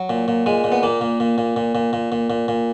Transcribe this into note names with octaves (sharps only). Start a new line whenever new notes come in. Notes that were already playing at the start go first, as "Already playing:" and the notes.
Already playing: F#3
A#2
A#2
A#2 G#3
A#2
B3
A#2 A#3
A#2
A#2
A#2
A#2
A#2
A#2
A#2
A#2
A#2